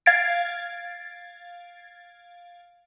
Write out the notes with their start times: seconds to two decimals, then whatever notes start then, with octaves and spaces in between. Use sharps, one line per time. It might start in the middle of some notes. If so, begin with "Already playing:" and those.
0.06 F5 G#6 A6 D7